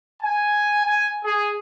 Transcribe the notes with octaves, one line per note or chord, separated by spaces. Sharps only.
G#5
G#5
G#4